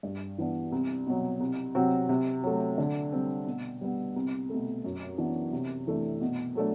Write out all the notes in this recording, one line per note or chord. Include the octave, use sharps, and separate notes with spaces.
G2
E3 B3 D4
C2
B2 F#3
C2
C3 F#3 C4 F#4
C3
F#3 A3
D3
G3 C4
B2
G3 B3
C2
B2 A3
F#2
E3 B3 D4
C3
E3 A3 D4
B2
F#3 A3 D4